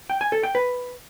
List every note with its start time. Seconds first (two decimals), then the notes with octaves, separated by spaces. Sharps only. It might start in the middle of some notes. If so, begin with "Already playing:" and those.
0.10 G5
0.21 G#5
0.32 A4
0.43 G5
0.55 B4